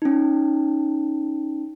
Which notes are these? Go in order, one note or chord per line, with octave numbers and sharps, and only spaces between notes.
C#4 D#4